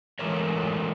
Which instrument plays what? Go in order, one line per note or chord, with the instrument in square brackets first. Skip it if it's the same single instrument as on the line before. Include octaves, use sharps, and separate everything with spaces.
[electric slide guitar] E3 G#3 A3 A#4 C#5